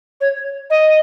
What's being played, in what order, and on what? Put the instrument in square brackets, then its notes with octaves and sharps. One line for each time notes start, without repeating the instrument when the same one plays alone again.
[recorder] C#5
D#5